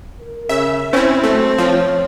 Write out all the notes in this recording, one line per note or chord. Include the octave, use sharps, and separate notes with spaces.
A#4
C#3 E5
C4 C#4 E4
F#1 B2 A3
F3 C#5